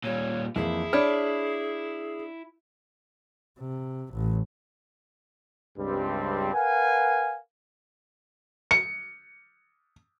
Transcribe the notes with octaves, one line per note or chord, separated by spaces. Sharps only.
A#2 G3 C#5
F2 E3 A#3 E4 G#4
D4 C#5 B5 F6
C3
A1
C#2 G2 G3 C4
A#4 B4 F5 F#5 G#5
C#7